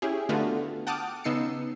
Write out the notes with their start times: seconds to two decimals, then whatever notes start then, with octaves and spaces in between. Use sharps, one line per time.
0.02 C#4 E4 G4 G#4
0.29 D3 A3 B3 F4 F#4
0.87 F#5 G5 A5 D6 D#6 F6
1.24 C#3 B3 D#4 E6 C7 C#7